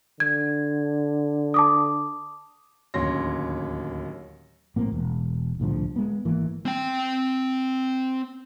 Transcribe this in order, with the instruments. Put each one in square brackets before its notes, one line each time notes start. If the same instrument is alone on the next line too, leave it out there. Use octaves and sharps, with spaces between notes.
[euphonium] D3 [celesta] G#6
[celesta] A5 D6 D#6
[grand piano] D1 D#2 C#4 C6 A#6
[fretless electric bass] A#1 A2 A#3 C4
E1
C2 A2 D3 F3
G#3 B3
G#1 E3 A#3
[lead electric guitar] C4 G5